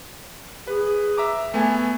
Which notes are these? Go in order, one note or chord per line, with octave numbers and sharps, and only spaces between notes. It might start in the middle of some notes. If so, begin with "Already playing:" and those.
G#4 B4
E5 A#5 D6
A3 B3 G#5